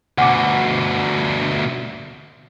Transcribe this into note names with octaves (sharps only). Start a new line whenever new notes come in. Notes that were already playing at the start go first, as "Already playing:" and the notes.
D2 B2 F#5 G#5 D6